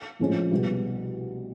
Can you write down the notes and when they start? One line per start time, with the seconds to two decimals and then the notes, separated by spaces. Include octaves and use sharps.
0.19 A#1 A2 F3 G#3 C#4
0.52 C2 B2 G3 B3